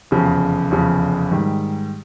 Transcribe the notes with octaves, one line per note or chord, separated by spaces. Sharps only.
F1 E2 C#3 F3
F1 E2 C#3 F3
G#2 D#3 G3